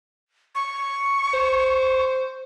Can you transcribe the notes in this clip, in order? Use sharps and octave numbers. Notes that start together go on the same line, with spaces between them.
C#6
C5